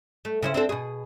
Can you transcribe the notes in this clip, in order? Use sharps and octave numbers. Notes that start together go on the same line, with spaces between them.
A3
C#3 E4 C5
C4 D4 A4
B2 G#4